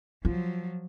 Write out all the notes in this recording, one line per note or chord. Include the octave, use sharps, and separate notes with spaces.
F3 F#3 F4